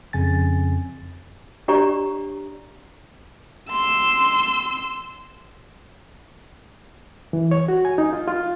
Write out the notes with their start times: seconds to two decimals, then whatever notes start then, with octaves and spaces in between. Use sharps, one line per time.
0.13 F2 C#3 G#5 A6
1.68 D4 G4 C#5 D5 A#5 C#6
3.69 C6 E6
7.33 E3
7.51 C#5
7.68 F#4
7.85 G#5
7.98 D#4
8.13 F4
8.28 F4